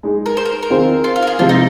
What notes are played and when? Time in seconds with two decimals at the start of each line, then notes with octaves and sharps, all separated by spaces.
0.03 G#3 D#4 G#4
0.26 A#4
0.37 C5
0.45 A#4
0.63 A#4
0.70 D#3 C4 F4 G#4 C5
1.04 F4
1.16 F4
1.22 A#4
1.27 G#4
1.39 C3 F3 G#3 F4
1.49 D#4